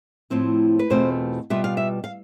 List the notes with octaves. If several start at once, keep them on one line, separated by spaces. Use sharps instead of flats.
A2 F3 C4 E4
B4
E2 B2 A3 C4 F4 C5
B2 G3 B3 F4 E5
F5
E5
F5